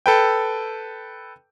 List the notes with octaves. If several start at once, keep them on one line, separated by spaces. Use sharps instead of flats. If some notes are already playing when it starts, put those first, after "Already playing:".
A4 B4 G5